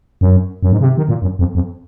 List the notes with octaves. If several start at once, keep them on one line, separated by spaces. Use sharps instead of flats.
F#2
F#2
G#2
C#3
C3
D#3
A#2
F#2
F2
F2